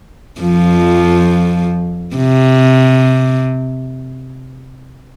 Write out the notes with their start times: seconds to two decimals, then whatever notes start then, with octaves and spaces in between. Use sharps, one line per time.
0.41 F2 F3
2.16 C3